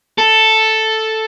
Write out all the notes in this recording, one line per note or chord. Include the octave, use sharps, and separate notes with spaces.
A4